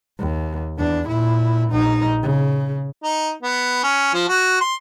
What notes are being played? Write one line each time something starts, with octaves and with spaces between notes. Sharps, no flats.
D#2
E2 D4
A#2 E4
A#1 D#4
C#3
D#4
B3
C#4
F3
F#4
C6